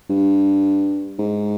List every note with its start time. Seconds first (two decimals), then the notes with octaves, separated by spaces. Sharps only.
0.10 G2
1.18 G#2